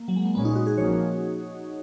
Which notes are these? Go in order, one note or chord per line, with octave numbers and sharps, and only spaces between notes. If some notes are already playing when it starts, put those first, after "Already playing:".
Already playing: A#3
F#3
G#3
A#3
A#2 G#3 B3 C#4
D#4
F#4
G#4
F3 A#3 C#4 C#5